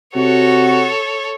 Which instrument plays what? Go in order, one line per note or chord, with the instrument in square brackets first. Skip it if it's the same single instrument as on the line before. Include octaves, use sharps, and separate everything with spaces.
[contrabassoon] C3 [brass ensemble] F#4 [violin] A4 C#5